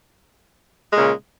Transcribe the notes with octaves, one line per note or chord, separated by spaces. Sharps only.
A#2 C#3 G#3